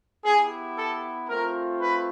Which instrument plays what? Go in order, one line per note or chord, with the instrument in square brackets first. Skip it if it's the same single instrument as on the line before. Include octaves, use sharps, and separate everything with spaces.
[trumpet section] B3 E4 G4 G#4
A4
A3 C4 F4 A#4
B4